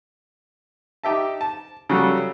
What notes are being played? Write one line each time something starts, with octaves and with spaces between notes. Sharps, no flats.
D#4 G4 E5 A5
A5
C#3 F#3 G3 A4